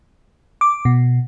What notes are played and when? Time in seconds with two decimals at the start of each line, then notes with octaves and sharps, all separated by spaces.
0.61 D6
0.85 B2